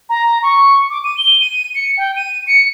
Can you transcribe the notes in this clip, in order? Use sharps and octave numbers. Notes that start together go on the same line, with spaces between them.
A#5
C#6
D6
D#7
G7
D#7
C#7
G5
D#7
C#7